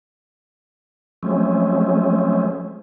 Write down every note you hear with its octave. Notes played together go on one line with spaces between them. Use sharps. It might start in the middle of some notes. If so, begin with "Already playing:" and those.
F3 F#3 G#3 A3 C4 C#4